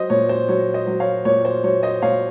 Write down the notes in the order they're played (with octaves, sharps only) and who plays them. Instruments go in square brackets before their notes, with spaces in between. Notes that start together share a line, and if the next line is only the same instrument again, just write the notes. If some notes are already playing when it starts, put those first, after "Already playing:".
Already playing: [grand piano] F#3 C5 D#5
A#2 C#5
C5
F#3 C#5
C5 D#5
F#3
C#5 F5
A#2 C#5
C5
F#3 C#5
C5 D#5
A#2 C#5 F5